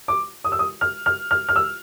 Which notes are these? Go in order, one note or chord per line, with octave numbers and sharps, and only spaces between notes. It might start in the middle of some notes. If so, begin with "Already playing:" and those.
D6
D#6
E6
D#6
F6
F6
F6
F6
E6